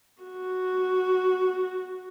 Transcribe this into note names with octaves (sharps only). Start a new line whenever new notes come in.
F#4